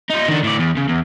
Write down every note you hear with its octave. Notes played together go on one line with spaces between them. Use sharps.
D#4 F4
D#3 D4
A2 D5
E2
C#3
E2